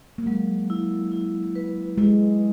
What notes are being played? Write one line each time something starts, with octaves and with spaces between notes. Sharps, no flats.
A#3
F#3 G#3
E4
E4
B4
G#3 E4